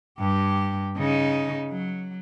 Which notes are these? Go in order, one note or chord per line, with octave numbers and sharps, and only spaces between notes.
G2 G4
C#3 D#4
F#3